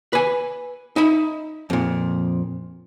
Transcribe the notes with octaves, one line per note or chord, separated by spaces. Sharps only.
B4 G#5
D#4 E5 B5
F2 A#2